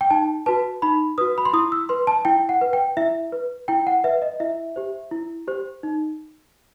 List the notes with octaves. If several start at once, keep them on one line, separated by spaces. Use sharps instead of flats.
G5
D#4 A5
F#4 B4 A5
D#4 B5
F#4 B4 D#6
B5
C6
E4 D#6
E6
B4 C6
A5
E4 G5
F#5
B4
G5
E4 E5
B4
E4 G5
F#5
B4 E5
D#5
E4 E5
G4 C5
E4
G4 C5
D#4